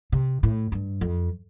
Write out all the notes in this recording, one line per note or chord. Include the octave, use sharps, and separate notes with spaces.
C3
A2
G2
F2